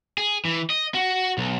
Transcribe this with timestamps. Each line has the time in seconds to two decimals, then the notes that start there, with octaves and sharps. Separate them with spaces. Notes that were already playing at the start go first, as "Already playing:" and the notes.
0.18 G#4
0.45 E3
0.70 D#5
0.94 F#4
1.38 B1